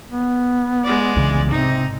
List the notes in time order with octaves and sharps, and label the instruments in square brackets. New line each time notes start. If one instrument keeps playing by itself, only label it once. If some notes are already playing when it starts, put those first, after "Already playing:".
[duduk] B3
[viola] G#3 D5
[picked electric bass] C2 C#3 E3
[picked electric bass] G#2 C3 [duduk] C4 [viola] D#4